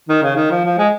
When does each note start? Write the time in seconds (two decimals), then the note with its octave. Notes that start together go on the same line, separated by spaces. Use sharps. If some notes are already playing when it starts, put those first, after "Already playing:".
0.09 D#3
0.23 C#3
0.36 D#3
0.51 F3
0.64 F3
0.78 G#3